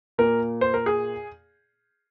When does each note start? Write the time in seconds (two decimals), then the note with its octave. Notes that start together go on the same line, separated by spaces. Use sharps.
0.18 A#2 A#3 A#4
0.61 C5
0.74 A#4
0.86 G#4